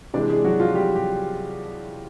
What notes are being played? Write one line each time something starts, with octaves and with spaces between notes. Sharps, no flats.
C3 E3 G#3 D4 D5
G#3 G#4
F#3 F#4
F3 F4
G3 G4
G3 G4